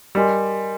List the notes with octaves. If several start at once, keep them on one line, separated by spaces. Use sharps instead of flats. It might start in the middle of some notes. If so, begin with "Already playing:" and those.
G3 G4 A#4 D#5 G#5 C6